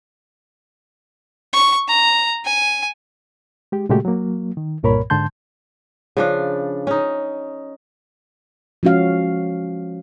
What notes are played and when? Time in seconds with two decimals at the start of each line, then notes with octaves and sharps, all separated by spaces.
1.53 C#6
1.88 A#5
2.45 G#5
3.72 G#3 G4
3.89 A#2 C#3 G#3 A3 F#4 G4
4.05 F#3 A#3
4.57 D#3
4.83 C2 G2 A#2 A#4 C#5 B5
5.10 G#2 D3 A5 C6 G6
6.17 C#3 F3 D4
6.87 C#4 D#4
8.83 F3 G#3 C#4 F#4 F5